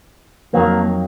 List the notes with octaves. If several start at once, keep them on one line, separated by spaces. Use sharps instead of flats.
F2 D#3 F#3 A#3